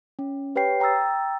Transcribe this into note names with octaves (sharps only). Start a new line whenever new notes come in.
C#4
G4 B4 C#5 G5 C7
G5 A#5 D#6 E6 A6